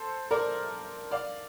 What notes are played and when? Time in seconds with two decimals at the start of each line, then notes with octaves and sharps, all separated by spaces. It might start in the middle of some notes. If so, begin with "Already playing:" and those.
Already playing: A4 C5
0.31 A#4 D5
1.11 D5 F5